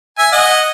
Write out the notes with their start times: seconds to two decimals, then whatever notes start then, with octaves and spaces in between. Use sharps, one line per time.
0.18 E5 G#5
0.32 D#5 F#5